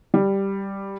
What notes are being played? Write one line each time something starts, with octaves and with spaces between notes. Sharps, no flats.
G3